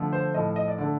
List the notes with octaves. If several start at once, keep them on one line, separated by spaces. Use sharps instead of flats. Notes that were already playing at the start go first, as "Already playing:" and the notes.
Already playing: D3 F3 A3
C5
A2 F3 A3 D#5
D#5
D5
D3 A3 D5